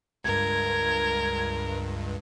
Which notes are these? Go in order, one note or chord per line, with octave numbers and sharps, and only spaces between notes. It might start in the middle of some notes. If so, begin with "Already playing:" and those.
C#2 G2 A#4 G#6